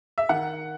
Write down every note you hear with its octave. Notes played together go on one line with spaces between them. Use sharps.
E5
D#3 F#5